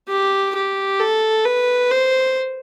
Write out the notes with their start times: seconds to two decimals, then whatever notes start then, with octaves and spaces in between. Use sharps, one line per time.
0.09 G4
0.55 G4
1.00 A4
1.45 B4
1.91 C5